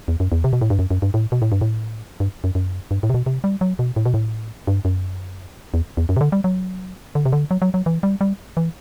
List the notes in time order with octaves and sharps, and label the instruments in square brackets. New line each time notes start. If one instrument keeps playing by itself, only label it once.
[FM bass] E2
F#2
E2
C3
B2
A2
G2
F#2
F#2
G2
A2
B2
A2
G2
A2
G2
F#2
F#2
G2
A2
C3
B2
C3
G3
F#3
B2
A2
B2
A2
G2
F#2
E2
E2
F#2
C3
D3
G3
F#3
D3
C3
D3
F#3
F#3
F#3
E3
G3
G3
E3